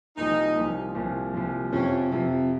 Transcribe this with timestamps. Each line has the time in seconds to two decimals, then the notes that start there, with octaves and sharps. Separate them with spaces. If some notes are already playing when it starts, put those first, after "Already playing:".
0.17 C2 A#2 F3 D#4
0.56 C2 A#2 F3
0.95 C2 A#2 F3
1.34 C2 A#2 F3
1.73 F2 C3 F3 C#4
2.11 F2 C3 F3